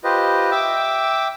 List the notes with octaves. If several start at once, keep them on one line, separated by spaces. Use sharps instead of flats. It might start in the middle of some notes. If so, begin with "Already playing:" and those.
F4 G4 B4 C5 D#5
E5 G5 D6 E6